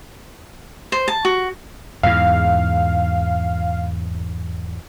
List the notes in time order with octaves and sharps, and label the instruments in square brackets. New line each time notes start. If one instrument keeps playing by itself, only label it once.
[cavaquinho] C5
A5
F#4
[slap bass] E2 G#2 [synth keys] F5